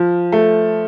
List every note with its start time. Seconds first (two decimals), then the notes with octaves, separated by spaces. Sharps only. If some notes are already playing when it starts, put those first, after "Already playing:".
Already playing: F3
0.32 A3